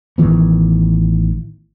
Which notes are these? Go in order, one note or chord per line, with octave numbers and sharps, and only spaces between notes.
A1 D#3 E3 B3